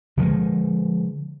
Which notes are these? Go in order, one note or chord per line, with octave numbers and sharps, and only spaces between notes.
D3 F3 G3 G#3